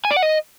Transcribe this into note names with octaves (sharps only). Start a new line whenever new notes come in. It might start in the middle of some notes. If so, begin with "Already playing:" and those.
G#5
D5
F#5
D#5